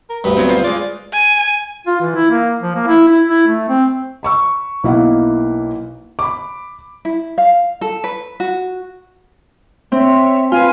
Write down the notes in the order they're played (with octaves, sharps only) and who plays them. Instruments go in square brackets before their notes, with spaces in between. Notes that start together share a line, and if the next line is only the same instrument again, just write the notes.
[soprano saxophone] A#4
[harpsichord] D2 G2 [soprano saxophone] B4
[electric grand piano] F#3 B3 C4
F4 C5
[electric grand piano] G#3 F4 [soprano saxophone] D5
[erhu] G#5
[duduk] F4
E3
E4
A#3
F3
A#3
E4
E4
E4
A3
C4
[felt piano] B5 C#6 E6
B1 A#3 E4 D#5 F5 F#5
B5 D6
[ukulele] E4
F5
A4
B4
F#4
[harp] C4 [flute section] C#5 E5
[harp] F4 [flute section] B4 F5 G#5